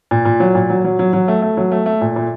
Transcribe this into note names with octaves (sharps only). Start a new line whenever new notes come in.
A#2
A#2
F#3
A#2
F#3
F#3
F#3
F#3
A3
A3
F#3
A3
A3
A#2
A#2